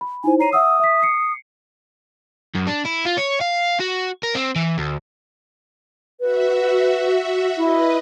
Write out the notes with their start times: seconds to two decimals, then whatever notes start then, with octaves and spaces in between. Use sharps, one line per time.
0.01 B5
0.24 D#4 E4 C5 G#5
0.40 C#5 A#5 C7 D#7
0.53 E5 F#5 D#6 E6
0.80 E5 B6
1.02 C7 C#7
2.55 F#2
2.67 D4
2.85 E4
3.05 F4
3.17 C#5
3.40 F5
3.80 F#4
4.23 A#4
4.35 C4
4.56 E3
4.78 D2
6.20 F#4 B4 E5
7.57 E4 B4 D#5